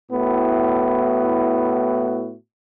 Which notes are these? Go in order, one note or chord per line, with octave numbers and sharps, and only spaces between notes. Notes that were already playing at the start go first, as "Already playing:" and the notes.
A2 B3 E4 F#4